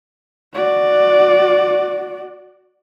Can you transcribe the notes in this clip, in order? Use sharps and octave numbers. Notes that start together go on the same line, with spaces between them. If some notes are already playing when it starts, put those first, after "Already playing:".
F#4 D5